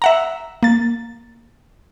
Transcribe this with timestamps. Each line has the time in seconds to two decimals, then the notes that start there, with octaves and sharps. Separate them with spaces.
0.02 E5 F#5 A#5
0.63 A#3 A6